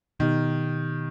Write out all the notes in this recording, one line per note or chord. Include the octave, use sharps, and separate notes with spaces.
B2 D#3 B3 D#4 G4